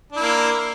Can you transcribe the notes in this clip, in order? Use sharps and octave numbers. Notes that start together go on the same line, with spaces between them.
A#3 D4 E4